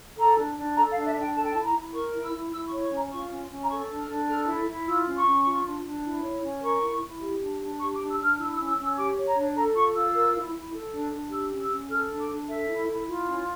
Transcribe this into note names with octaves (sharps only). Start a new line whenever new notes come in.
A4 A#5
D4
D4
A4 A#5
F5
D4
E5
D4
G5
A4 A5
G5
A5
E4
A#5
E4
A#4 C#6
E4
E6
E4
E4 E6
C#6
C#5
C#6
C#4
A#5
F4 C#6
C#4
C#4
A#5
A4 C#6
D4
F6
D4
A4 F6
E4
E4
F4 E6
C#4
C#6
C#4
F4
D4
D4
E4
C#5
C#4
A#4 C#6
E4
E4
G4
D4
D4
G4 C#6
D6
D4
E6
D4 F6
E4 E6
E6
C#4
E6
C#4 E6
G4 D6
C#5
A#5
D4
A4 A#5
F4 C#6
F4 E6
A#4
E4
E4
A4
D4
D4
G4 E6
C#4
E6
C#4
A4 F6
D4
D6
D4
A4 E5
E4
E4
F4
C#4